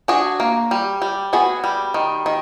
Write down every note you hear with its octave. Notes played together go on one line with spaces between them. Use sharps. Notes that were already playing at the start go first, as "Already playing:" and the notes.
D4 F#4 G#4
A#3
G3
G3
B3 F#4 G#4
G3
D#3
D#3